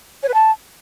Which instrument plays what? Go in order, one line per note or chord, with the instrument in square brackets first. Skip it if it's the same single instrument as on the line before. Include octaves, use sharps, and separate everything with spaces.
[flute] C#5
B4
A5